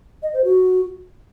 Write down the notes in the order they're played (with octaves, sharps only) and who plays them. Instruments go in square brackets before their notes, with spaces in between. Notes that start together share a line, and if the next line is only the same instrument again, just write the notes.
[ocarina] D#5
C5
F#4